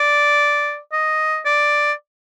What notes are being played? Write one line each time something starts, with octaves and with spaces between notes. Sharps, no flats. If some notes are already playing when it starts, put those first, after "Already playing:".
Already playing: D5
D#5
D5